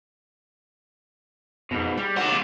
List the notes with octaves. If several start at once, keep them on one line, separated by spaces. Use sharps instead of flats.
F2 G#2 B2
G3 G#3
D#3 F#3 G4 F#5
D#2 F4